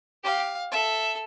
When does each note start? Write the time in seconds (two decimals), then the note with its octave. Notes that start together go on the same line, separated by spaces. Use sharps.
0.24 G4 F5
0.72 A4 E5